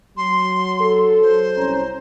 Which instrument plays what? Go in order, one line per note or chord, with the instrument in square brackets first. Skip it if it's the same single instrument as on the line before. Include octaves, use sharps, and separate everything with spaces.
[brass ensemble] F#3 [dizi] C6
[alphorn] A4
[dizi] C5
[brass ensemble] C2 A#5 [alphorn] C#4